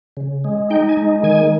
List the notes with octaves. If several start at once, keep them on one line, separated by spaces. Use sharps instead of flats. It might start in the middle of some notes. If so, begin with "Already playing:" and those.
C#3
G#3
D#4 G5
G#5
G#3
D#3 G#5